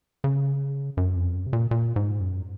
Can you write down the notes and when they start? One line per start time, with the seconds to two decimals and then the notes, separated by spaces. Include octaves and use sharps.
0.24 C#3
0.97 F#2
1.16 F2
1.34 F#2
1.46 C3
1.53 A#2
1.71 A#2
1.96 G#2
2.20 F#2